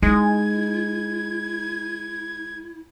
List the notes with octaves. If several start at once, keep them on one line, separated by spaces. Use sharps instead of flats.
G#3 D#4 E4 G#6